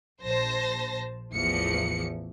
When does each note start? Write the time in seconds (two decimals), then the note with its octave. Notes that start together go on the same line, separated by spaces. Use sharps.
0.23 A#1 C5 A5 A#6
1.32 A1 E2 E3 F3 C#7